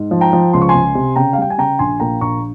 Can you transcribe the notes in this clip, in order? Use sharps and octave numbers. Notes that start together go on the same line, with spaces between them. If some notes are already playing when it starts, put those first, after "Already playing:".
Already playing: G#2
F3
G5 A#5
F3
C#2 C6
C#6
G#5 C6
C#2
C3
C#3 G5 A#5
F5
G3 G5
G#5
C#3 G5 A#5
A#1 G#5 C6
A#2 G5 A#5
A#1 A#5 C#6